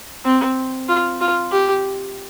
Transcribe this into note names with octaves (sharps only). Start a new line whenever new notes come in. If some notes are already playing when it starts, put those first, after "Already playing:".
C4
F4
F4
G4